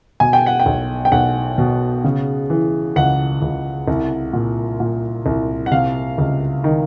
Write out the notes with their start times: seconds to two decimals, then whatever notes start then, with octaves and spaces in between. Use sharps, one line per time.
0.20 B2 G#5
0.33 G5
0.46 F#5
0.60 G5
0.66 B1
1.05 G5
1.12 B1 F#5
1.58 B2
2.04 C#3
2.50 E3
2.96 C#2 F#5
3.42 C#2
3.88 C2
4.33 A#2
4.80 A#2
5.26 C2
5.66 F#5
5.71 C3 F5
6.18 C#2
6.64 D#3